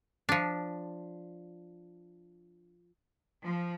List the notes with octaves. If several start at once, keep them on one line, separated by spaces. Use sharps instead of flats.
F3 D4
F3